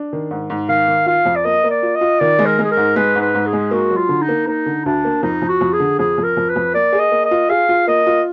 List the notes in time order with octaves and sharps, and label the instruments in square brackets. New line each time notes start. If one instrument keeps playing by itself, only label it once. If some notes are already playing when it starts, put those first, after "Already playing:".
Already playing: [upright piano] D4
D#3
G#2
G#2
[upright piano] D#3 [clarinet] F5
[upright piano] D#3
[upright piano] F4 [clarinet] F5
[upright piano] F2
[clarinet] D5
[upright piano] A#3 [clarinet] D#5
[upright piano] A#3
[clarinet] D5
[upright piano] F4
[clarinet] D#5
[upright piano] F4
[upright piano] D#3 [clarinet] D5
[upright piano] G#3
[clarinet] A#4
[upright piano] G#3 [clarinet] G#4
[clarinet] A#4
[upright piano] G#2
[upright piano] G#3 [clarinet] B4
[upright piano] G#2
[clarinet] B4
[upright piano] G#2
[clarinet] G#4
[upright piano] G#3
[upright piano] A#3 [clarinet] F#4
[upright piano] F#3
[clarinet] F4
[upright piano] D3
[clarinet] D#4
[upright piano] A#3
[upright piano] A#3 [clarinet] D#4
[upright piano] D3
[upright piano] D2 [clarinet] D4
[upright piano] A#3
[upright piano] F2 [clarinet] D#4
[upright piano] F2
[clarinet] F#4
[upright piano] F2
[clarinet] G#4
[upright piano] D3
[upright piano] F2 [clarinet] G#4
[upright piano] F2
[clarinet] A#4
[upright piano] F2
[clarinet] B4
[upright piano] F2
[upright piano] A#3 [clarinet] D5
[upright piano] G#4
[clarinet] D#5
[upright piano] A#3
[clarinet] D#5
[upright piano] F4
[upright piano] G#4 [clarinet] F5
[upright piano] F4
[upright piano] A#3 [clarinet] D#5
[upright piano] F4